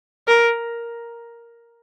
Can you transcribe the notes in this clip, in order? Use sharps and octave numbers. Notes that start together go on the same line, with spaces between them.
A#4